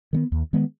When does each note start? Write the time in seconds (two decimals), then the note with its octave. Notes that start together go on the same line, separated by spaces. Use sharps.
0.13 D#3 G#3 B3
0.32 D#2
0.53 D#3 G#3 B3